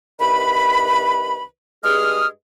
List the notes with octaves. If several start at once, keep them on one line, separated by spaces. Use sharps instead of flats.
C2 D#3 B4 B5
G2 G#3 G#4 D#6 F6